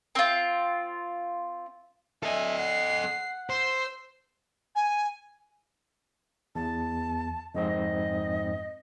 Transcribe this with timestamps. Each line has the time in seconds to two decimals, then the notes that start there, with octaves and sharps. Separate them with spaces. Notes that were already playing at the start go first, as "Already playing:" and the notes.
0.15 C4 F4
2.23 D4 A4 D#5 E5 G#5
2.59 F#5 C7
3.50 C5 C6 E6
4.76 G#5
6.55 E2 A5
7.55 F2 G#2 C4 D#5